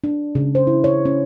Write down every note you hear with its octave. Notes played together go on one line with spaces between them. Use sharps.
D4
C#3
C5
E4
C#5
C#4